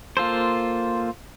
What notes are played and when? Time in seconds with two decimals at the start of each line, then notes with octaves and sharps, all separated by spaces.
0.17 A#3 F4 A4 C5